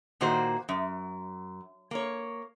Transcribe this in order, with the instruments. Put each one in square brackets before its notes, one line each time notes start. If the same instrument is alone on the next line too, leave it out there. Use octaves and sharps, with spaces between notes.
[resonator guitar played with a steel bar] A#2 D#3 A#3 F#4 C5
F#2
A#3 C#5